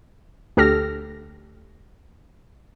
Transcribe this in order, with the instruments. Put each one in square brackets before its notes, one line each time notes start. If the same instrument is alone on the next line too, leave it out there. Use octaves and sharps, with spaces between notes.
[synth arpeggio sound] D2 G4 A4 F6 A#6